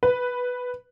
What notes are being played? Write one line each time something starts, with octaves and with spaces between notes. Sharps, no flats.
B4